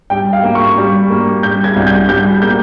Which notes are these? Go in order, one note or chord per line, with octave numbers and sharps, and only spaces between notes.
G3 G5
F5
A#3
C#6
G3
A#3
G3 G6
G#6
C2
G6
G3 G6
A#3 G6